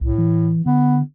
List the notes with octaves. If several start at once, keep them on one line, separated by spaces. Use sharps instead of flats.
C2 A2
E3
D3 B3